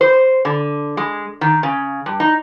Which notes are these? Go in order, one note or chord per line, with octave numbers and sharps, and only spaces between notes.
C5
D3
G#3
D#3
C#3
G2
D#4